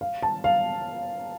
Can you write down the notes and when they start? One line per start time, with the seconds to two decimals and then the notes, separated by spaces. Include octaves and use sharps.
0.01 F5
0.22 A5
0.44 F5